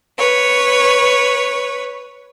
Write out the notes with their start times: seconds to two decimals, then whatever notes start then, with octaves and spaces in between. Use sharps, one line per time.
0.18 B4 C#5